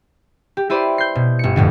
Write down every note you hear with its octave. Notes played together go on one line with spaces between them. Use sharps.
G4
E4 G4 B4 C5 D5 C6
G6 C7
B2
G1 C#7
F2 A2 D3